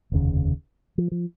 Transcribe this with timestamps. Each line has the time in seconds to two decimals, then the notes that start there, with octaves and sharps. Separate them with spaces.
0.12 F1 D#2 C#3
0.98 F3
1.11 F3